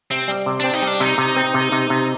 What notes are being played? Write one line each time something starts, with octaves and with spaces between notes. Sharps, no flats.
C3 C4
G3
C3
C4 D4
D#4
G3
D4
C3 D#4
C3
C4
C3
C3
C3